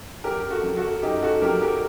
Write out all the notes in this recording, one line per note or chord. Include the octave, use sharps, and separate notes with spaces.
F#2 G4 A#4
F#4 A4
F#3
F#4 A4
F#2 D#4 G4
F#4 A4
F#3 G4 A#4
G4 A#4